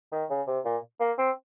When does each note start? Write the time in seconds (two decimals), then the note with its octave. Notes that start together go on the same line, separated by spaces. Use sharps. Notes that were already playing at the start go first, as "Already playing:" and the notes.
0.12 D#3
0.30 C#3
0.47 C3
0.65 A#2
1.00 A#3
1.18 C4